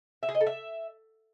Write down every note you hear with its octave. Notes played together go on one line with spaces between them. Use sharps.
E5
G#4
D#5
A4
E5